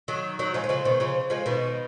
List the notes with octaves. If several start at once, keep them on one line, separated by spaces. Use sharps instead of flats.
D#3 F#3
D#3 F#3
F3 G#3
D#3
C#3 F3
B2 D#3
C#3 F3
F3 G#3
B2 D#3